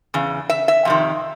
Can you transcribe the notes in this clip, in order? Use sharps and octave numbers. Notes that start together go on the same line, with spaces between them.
E2 C#3
E5
E5
F2 C3 D#3